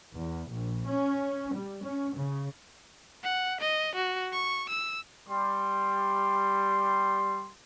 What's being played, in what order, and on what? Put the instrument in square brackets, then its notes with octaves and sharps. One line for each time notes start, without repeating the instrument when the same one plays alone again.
[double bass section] E2
A#1
C#4
G3
C#4
C#3
[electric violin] F#5
D#5
F#4
C#6
E6
[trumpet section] G3 C6